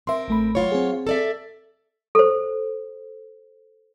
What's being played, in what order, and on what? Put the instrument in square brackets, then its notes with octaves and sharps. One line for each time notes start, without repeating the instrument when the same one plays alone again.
[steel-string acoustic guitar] C4 A#4 [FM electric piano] E5 C6
[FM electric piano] A1 A3 B5
[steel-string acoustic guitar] F#3 F4 C#5
[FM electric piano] C4 G#4
[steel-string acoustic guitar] A4 D5 E5
[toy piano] A4 C5